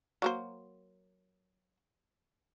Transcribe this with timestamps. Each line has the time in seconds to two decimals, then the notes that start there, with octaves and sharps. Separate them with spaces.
0.22 F#3 A#3 C5